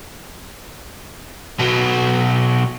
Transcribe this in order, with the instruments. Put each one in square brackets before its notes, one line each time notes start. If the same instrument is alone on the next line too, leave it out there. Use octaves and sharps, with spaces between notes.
[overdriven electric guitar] B2 F#3